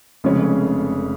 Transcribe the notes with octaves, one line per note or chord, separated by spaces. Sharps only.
F1 F2 C#3 G#3 C#4